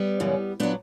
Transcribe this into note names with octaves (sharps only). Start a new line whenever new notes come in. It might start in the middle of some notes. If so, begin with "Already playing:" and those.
Already playing: G3 B3
F#2 C#3 E3
A#2 F#3 B3 D4